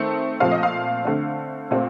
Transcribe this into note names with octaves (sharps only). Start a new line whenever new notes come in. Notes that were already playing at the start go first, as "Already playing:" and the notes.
Already playing: D#3 A3 C4
A#2 F3 A3 C4 F5
D#5
F5
D3 A3 C4
A#2 A3 C4